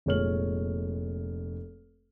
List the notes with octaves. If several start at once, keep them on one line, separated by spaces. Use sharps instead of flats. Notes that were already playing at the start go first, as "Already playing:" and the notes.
F1 A#2 G#3 C#5 F6 F#7